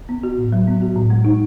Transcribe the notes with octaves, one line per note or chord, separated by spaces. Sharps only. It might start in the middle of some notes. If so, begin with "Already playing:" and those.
B3
F#4
A2
F#3
B3
F#4
A2
G#3
D#4